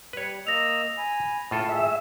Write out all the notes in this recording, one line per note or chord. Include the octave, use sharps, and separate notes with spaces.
G3 B4 C#5
A#3 D#5 E6 A#6 F7
G#5 B5
A2 C#3 F4 A4
G#4 E5